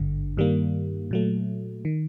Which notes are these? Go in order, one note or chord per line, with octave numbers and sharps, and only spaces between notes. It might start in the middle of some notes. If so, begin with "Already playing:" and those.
Already playing: G#1 G2 D3
G2 D#3 G3 A#3
A#2 F#3 A3
D#3